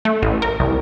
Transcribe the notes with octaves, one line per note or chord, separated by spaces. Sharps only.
A3
A1
A#4
C2